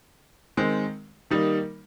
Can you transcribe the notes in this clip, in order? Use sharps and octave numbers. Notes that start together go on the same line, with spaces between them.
D#3 G#3 C4
D#3 G3 A#3 D#4